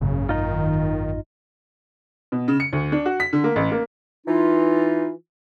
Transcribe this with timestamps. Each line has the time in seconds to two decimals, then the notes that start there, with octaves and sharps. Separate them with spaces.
0.01 G#1 F#2 A#2 C#3
0.29 D#3 D#4 F4
2.32 B2
2.48 C#3
2.60 C#7
2.73 D2
2.92 D4
3.06 F#4
3.20 B6
3.33 D3
3.44 A#3
3.56 A1
3.72 A#3
4.27 E3 D#4 F4